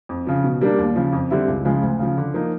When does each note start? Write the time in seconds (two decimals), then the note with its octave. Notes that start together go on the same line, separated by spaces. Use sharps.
0.09 F2
0.27 C#3 F3
0.44 B2
0.61 G3 A#3 D4
0.78 D#2
0.96 C#3 F3
1.13 F2
1.31 D3 G3 C4 E4
1.48 C#2
1.65 C#3 F3 G#3
1.82 D2
1.99 C#3 F3
2.17 D3
2.34 F3 A#3 D#4